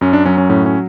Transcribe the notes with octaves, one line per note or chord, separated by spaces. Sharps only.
F#2 C#4
D4
F#3 C#4
C#4
A2 C#4
C#4